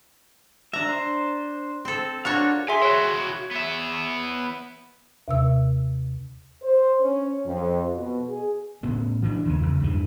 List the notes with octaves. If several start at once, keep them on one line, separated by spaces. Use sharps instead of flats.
D4 E5 A#5
D4 C5
C4 A4
D4 F4 F#4 A#4 C#5 F5
G#4 E5 G#5 C6
E4 F#4 C#5
B3 E5
D#2 C3 E6
C5
C#4
F2
B2
G#4
A2 B3 C#4
E3 F3 D4
D#2 C#3 E3
E2 C#3
E2 G2 E3